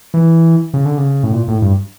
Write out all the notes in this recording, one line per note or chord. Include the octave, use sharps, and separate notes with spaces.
E3
C#3
D3
C#3
A2
A#2
A2
G2